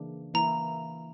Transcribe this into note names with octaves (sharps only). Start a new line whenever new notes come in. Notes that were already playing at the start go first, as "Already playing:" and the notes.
Already playing: C#3 E3 A#3 D4
E3 A#3 E4 A#5